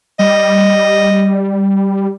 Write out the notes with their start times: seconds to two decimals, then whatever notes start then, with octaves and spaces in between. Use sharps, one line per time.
0.19 G3 D#5